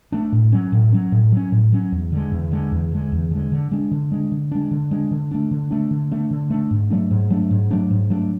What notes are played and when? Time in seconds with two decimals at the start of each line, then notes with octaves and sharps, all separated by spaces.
0.12 A3 D4
0.32 A2
0.52 F#3 C#4
0.72 A2
0.92 F#3 C#4
1.12 A2
1.32 F#3 C#4
1.52 A2
1.72 F#3 C#4
1.92 E2
2.12 D3 G#3
2.32 E2
2.52 D3 G#3
2.72 E2
2.92 D3 G#3
3.12 E2
3.31 D3 G#3
3.52 D3
3.71 G#3 D4
3.91 D3
4.11 G#3 D4
4.32 D3
4.51 G#3 D4
4.71 D3
4.91 G#3 D4
5.11 D3
5.31 A3 D4
5.51 D3
5.71 A3 D4
5.91 D3
6.11 A3 D4
6.31 D3
6.50 A3 D4
6.71 G#2
6.90 F#3 A3 D4
7.11 G#2
7.30 F#3 A3 D4
7.51 G#2
7.71 F#3 A3 D4
7.91 G#2
8.10 F#3 A3 D4